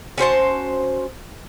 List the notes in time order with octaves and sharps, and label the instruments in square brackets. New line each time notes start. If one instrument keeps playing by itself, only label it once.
[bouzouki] C#4 F#4 C5 A5